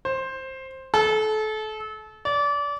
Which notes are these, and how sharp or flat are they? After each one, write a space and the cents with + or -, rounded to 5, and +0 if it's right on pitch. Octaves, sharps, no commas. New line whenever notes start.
C5 +10
A4 -30
D5 -30